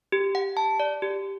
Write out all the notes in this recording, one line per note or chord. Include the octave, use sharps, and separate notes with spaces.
G4
F#5
A5
D5
G4